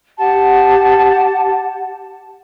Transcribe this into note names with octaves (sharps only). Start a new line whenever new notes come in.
G4 F#5 A5